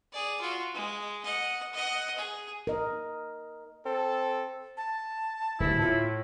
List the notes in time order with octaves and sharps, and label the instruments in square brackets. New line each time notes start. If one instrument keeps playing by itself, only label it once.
[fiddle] G#4 D5
F4 F#4
G#3
D#5 F#5
D#5 F#5
G#4
[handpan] A#4 D#5
[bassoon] C4 [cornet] A4
[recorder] A5
[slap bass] D1 G2 [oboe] E4
[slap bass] A2 [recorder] F4